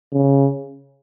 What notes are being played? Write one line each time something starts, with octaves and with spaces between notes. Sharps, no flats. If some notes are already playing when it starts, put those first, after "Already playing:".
C#3